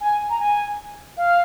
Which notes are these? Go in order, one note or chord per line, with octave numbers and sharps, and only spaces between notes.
G#5
A#5
G#5
F5